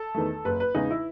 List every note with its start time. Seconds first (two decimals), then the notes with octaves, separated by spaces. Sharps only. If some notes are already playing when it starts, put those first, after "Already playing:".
Already playing: A4
0.15 E2 D#3 A3
0.45 F#1 B4
0.60 B4
0.75 E2 C#3 G#3 D#4
0.91 E4